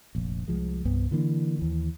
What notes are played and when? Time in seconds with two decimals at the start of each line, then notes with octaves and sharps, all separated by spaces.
0.15 F1 A#1
0.48 C2 F3 G#3
0.85 C2 G2 B3
1.11 D3 E3 A#3 D4
1.59 D#2 E3